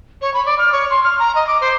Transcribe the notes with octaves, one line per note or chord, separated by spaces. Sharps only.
C#5
B5
D5
F6
C#5
C6
F6
A#5
D#5
D6
C5